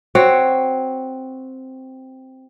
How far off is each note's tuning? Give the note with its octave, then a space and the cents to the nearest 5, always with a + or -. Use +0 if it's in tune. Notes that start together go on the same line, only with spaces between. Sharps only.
C4 +0 F#4 +0 C#5 +0